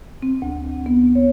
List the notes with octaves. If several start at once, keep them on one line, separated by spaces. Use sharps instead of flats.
C4
D2
B3
C#5